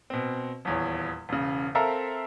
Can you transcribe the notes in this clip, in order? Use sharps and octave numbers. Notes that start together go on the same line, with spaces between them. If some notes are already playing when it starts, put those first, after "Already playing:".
B2 C4
D#1 E2 C#5
E1 C#3
C4 A4 A#4 E5 F5 A#5